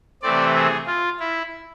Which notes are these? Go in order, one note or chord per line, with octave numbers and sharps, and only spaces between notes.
C3 E3 A3 C4 D5
G#4
F4
E4